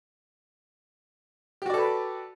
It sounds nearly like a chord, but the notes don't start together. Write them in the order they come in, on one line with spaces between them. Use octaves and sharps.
G4 F#4 D5 A4 B4